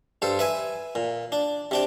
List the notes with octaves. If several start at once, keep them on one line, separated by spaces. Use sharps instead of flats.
G2 A4 C5
B4 E5 G#5
A#2
D4
C3 D4 G5